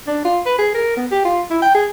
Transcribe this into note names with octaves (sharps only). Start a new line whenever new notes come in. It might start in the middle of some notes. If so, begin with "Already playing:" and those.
D4
F4
B4
G#4
A#4
B3
G4
F4
E4
G5
G#4